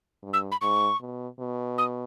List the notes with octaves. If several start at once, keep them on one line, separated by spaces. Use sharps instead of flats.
G2
E6
B5
G#2 C#6
B2
B2
D#6